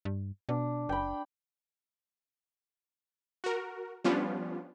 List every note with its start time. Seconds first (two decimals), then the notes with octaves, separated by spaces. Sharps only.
0.05 G2
0.49 B2 D4
0.89 F#1 G5 B5
3.44 F#4 A#4
4.04 F3 G3 B3 C#4 D4 F4